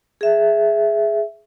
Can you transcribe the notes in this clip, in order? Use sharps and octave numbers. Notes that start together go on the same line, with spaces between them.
G#4 E5